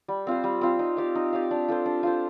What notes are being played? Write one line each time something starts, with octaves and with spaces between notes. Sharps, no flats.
G3
C4 F4 C5
G3
C4 F4 C5
D#4
G4 D5 F5
D#4
G4 D5 F5
D4
F4 A4 C5
D4
F4 A4 C5